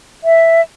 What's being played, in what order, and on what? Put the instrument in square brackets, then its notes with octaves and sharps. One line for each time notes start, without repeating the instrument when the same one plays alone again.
[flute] E5